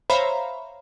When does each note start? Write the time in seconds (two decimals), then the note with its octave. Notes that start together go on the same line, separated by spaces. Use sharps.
0.10 C5 C#5 E5 F5 A#5 B5